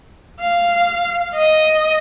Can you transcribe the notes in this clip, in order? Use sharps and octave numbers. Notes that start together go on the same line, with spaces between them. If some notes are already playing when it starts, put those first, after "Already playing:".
F5
D#5